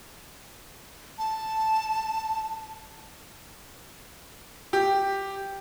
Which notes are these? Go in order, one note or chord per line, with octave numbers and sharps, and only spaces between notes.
A5
G4